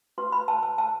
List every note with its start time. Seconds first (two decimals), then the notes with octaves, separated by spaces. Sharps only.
0.18 F#4 B4 C6
0.32 B5
0.48 A5
0.63 A5
0.78 A5